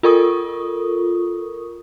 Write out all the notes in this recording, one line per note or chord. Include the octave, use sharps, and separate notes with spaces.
F4 A4 A#4 C#6 D#6